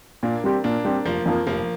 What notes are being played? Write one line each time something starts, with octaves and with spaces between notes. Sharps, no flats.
A#2 A#3 D4
G3 C4 G4
A#2 A#3 D4
G3 C4 G4
F1 F3 A#3
F2 F3 A#3
F1 F3 A#3